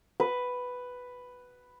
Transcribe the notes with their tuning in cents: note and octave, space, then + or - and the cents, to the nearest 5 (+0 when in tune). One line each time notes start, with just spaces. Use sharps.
B4 +5